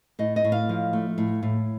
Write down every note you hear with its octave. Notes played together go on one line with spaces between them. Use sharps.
A2 D#5
D#5
A2
F5
F3
A3
A2
A2